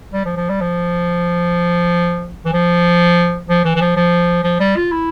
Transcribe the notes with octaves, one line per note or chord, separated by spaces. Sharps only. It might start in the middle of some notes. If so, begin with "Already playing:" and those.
G3
F3
F3
G3
F3
E3
F3
F3
E3
E3
F3
F3
F3
G3
F4
E4